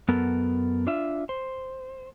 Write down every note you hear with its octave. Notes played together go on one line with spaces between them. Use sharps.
F#2 B3 A4 A#4
D4 F4 E5
C5